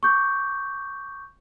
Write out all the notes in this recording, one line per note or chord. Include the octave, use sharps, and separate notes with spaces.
C#6 D6 G6